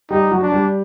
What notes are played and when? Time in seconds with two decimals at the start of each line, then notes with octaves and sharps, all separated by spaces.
0.10 G3 D#4 G4
0.31 F#3 F#4
0.42 D4
0.52 G3 G4